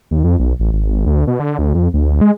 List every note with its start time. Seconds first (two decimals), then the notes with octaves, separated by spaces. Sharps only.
0.11 D#2
0.24 F2
0.39 B1
0.60 A1
0.73 G#1
1.06 D2
1.27 B2
1.40 D3
1.58 D2
1.75 F2
1.94 D2
2.21 G#3